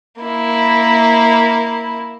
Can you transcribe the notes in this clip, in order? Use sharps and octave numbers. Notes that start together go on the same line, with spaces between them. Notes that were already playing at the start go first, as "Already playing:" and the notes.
A#3 E4